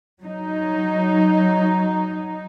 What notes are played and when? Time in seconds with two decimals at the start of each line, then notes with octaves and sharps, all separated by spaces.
0.21 F#3 D#4